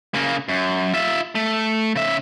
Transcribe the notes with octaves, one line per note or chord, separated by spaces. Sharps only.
C#3 A#3
F#2
F4 E5
A3
C#3 E5